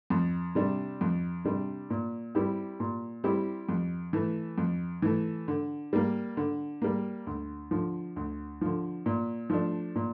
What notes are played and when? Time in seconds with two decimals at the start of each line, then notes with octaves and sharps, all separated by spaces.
0.10 F2
0.55 C3 G3 D4
1.01 F2
1.45 C3 G3 D4
1.90 A#2
2.35 G3 C4 E4 G4
2.80 A#2
3.24 G3 C4 E4 G4
3.69 F2
4.13 E3 A3
4.58 F2
5.02 E3 A3
5.48 D3
5.93 G3 A#3
6.37 D3
6.82 G3 A#3
7.27 D2
7.71 D3 F3
8.16 D2
8.61 D3 F3
9.06 A#2
9.50 F3 A3 D4
9.96 A#2